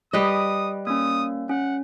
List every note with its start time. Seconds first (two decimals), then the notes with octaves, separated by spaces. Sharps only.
0.13 G3 B4 D#5 D#6
0.87 A#3 C#4 D#6
1.49 C#4 F#5